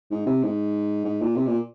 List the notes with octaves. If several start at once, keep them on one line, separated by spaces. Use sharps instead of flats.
G#2
C3
G#2
G#2
A#2
C3
A#2